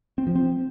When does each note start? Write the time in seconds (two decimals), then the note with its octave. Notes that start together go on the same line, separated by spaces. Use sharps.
0.18 C4
0.27 F3
0.36 C4